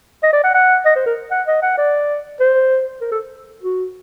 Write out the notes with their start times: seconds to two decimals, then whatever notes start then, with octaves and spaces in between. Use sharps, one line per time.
0.23 D#5
0.33 D5
0.44 F#5
0.54 F#5
0.85 D#5
0.96 C5
1.06 A#4
1.31 F#5
1.47 D#5
1.62 F#5
1.77 D5
2.40 C5
3.01 A#4
3.11 A4
3.62 F#4